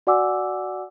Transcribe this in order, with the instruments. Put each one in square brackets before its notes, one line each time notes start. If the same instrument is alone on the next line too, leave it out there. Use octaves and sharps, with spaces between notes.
[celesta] F#4 D5 F#5 G#5 D6 E6